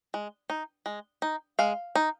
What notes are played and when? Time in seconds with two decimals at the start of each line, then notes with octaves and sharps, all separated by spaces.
0.14 G#3
0.50 D#4
0.86 G#3
1.22 D#4
1.59 G#3 F5
1.95 D#4